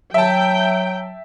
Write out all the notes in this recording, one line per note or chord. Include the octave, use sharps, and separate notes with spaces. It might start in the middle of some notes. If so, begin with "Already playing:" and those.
F#3 E5 G5 A5